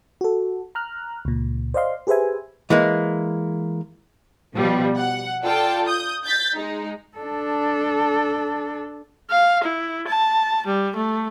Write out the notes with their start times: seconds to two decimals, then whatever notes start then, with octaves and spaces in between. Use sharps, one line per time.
0.21 F#4 A4
0.75 A#5 F6 F#6
1.25 C#2 A#2
1.74 C5 D5 D#5 F5 C6
2.07 G4 G#4 B4 C5 E5 G#5
2.70 E3 G#3 A#3
4.55 B2 F3 G3
4.97 F#5
5.44 F4 A4 D5 G5 A5
5.88 D#6 G6
6.25 G6 A6 B6
6.55 G#3 D#4
7.17 D4 A4
9.30 F5
9.64 E4
10.07 A5
10.66 G3
10.96 A3